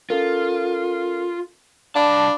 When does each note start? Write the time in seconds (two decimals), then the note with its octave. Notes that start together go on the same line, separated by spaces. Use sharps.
0.10 C#4 F4 A4 A#4
1.96 C2 D4 F5 A5 B5 D6